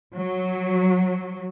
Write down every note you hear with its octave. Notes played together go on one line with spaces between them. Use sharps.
F#3